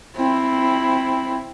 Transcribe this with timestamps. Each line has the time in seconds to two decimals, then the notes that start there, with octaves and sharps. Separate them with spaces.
0.17 C4 E4